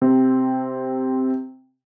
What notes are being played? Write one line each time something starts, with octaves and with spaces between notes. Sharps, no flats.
C3 C4